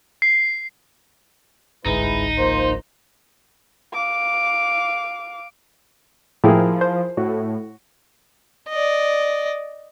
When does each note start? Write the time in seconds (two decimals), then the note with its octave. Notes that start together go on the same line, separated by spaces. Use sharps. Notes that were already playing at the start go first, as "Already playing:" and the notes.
0.22 C7
1.86 G1 C2 G#2 G#3 D#4 E4 B4
2.38 F3 A#3 C5
3.93 F5 D6
6.44 A2 F3 A#3 E4 G4 G#4 A#4
6.81 C5
7.17 A2 F#4
8.69 D5 D#5